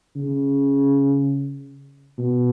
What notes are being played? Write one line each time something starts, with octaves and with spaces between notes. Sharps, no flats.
C#3
B2